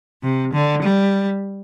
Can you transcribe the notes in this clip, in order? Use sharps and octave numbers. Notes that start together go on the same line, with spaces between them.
C3
D3
G3